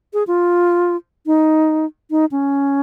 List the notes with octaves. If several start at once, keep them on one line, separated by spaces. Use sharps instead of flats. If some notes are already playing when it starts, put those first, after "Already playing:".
G#4
F4
D#4
D#4
C#4